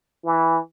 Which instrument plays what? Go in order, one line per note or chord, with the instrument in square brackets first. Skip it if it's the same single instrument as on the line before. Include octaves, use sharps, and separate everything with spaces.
[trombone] E3